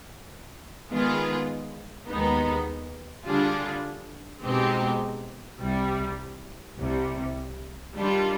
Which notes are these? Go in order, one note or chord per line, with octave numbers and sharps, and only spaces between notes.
D#3 G#3 B3 F4 G#4
D#2 D#3 G#3 B3 D#4
D3 G3 D4 F4 G#4
B2 G#3 C4 D#4 G4
C2 C3 G3
C2 C3 G3
D#3 G3 D4 F4